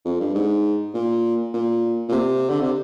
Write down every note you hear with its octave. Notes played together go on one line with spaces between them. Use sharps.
F2
G2
G#2
A#2
A#2
A#2
C3
D3
C3